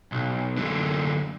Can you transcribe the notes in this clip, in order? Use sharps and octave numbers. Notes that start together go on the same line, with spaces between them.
B1
F#2 D3